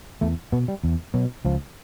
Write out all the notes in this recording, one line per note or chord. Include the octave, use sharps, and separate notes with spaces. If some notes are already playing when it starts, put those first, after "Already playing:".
E2 A3
B2 B3
G3
E2
B2 F#3
C#2 F3